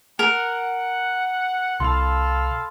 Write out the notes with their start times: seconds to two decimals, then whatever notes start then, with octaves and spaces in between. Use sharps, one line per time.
0.19 A#4 F#5
1.80 C2 A4 F5 B5 C6